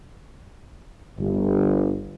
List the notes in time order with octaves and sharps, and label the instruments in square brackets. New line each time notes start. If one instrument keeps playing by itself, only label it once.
[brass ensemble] G1